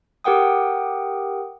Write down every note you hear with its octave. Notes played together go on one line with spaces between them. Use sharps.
G4 A#4 F#5 G5 D#6